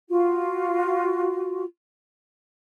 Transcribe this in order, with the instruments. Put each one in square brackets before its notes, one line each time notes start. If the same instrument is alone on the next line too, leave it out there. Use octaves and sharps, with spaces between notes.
[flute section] F4 F#4